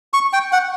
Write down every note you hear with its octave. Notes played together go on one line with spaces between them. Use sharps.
C#6
G5
F#5